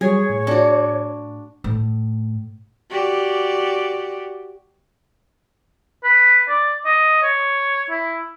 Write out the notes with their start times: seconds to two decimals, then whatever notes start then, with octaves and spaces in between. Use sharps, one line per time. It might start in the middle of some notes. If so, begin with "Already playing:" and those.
0.01 F#3 G3 G#4 C#5 G#6
0.30 A2
0.47 D4 F#4
1.64 A2
2.90 F#4 G4 D5
6.04 B4
6.49 D5
6.85 D#5
7.23 C#5
7.90 E4